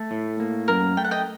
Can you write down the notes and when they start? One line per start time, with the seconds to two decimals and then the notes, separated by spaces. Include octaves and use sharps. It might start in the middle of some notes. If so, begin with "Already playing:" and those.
Already playing: A3 A4
0.11 A2
0.40 A#3
0.68 F#2 A#4
0.97 A3 G5
1.04 F#5
1.11 D#5 G5